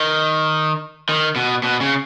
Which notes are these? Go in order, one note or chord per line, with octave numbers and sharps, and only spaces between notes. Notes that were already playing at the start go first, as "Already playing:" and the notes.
Already playing: D#3
D#3
B2
B2
C#3